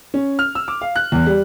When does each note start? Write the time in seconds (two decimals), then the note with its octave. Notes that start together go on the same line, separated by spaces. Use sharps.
0.14 C#4
0.39 F6
0.55 E6
0.68 D6
0.81 F5
0.96 F#6
1.12 E2
1.26 G3